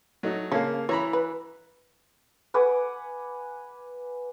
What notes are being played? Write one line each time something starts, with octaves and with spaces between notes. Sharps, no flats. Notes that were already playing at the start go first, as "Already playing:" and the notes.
F#3 A3 D#4
C#3 A#3 C#4 A4 F5
E3 C#5 A#5 B5
B4
B4 F#5 G#5 D6